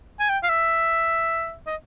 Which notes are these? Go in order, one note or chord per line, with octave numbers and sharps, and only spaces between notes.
G#5
G5
F5
E5
D#5